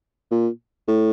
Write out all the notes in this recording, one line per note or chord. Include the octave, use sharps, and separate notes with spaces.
A#2
A2